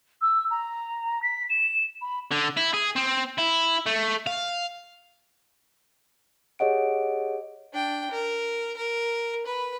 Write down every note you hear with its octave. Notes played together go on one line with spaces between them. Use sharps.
E6
A#5
B6
E7
B5
D3
E4
G#4
C4
E4
A3
F5
G4 G#4 C#5 D#5 F#5 D7
D4 G5
A#4
A#4
B4